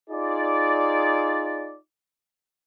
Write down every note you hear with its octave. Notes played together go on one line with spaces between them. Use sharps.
D#4 F4 G#4 D5